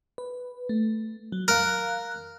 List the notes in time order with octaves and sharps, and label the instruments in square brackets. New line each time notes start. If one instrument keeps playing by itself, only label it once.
[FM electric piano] B4
A3
F#3
[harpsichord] A#4 [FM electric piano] F5 F#6